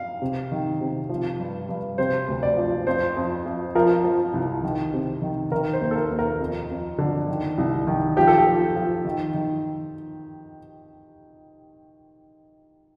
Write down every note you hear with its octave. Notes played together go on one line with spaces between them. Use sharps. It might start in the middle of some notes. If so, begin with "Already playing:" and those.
Already playing: F5
C3
D#3
C3
F3
G2
G2
C3 C5
D2
D5
F3
F2 C5
F2
F2
F3 A#4
F3
C2
D#3
C3
D#3
D#3 A#4
C5
D#2
A4
A#4
D#2
A#4
F2
F2
D3
D#3
C2
D#3
F3 G4
A4
G4
F3
F3
D#3
D#3